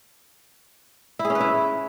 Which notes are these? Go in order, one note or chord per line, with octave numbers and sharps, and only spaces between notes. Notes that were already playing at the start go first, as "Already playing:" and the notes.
E4
G#4
C#4
B4
E4